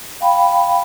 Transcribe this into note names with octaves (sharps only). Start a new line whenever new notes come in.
F5 G5 B5